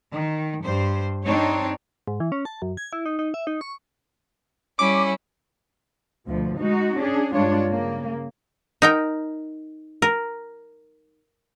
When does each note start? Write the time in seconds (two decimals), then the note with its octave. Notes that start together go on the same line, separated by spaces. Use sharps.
0.12 D#3
0.61 G2 C5
1.25 C4 D4 D#4 C#5
2.07 G#2
2.20 E3
2.32 C#4
2.45 A5
2.62 F#2
2.77 G#6
2.93 E4
3.06 D#4
3.19 D#4
3.34 E5
3.47 D#4
3.61 C#6
4.79 G3 C#4 E4 D6
6.27 D2 B2 F3
6.57 G#3 D#4 F#4
6.97 C#4 D4 G#4
7.33 G2 G#3 D4 F4 C#5
7.68 C#3 A#3
8.82 D#4 A#4 G5
10.02 A#4